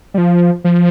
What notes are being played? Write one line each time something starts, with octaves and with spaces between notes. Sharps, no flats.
G3
F3
F3